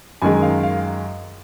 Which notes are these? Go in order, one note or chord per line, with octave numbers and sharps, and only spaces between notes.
F#2 D#3 G#3 G#5
F5
F5